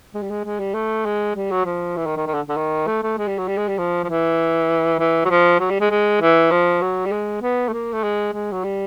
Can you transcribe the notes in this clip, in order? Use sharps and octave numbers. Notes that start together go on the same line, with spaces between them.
G#3
G3
G#3
G#3
G3
A3
G#3
G3
F#3
F3
E3
D#3
D#3
D#3
D3
D3
D#3
A3
A3
G#3
G3
F#3
G3
G#3
G3
F3
F3
E3
E3
F#3
F3
F#3
G3
G#3
G#3
E3
F3
F#3
G3
G#3
B3
A3
A#3
A3
G#3
G#3
F#3
G3